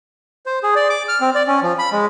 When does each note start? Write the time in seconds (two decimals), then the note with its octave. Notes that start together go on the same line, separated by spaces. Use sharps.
0.46 C5
0.63 G#4
0.75 D5
0.90 D6
1.09 F6
1.21 C4
1.35 D5
1.48 C#4
1.63 F3
1.79 B5
1.92 G#3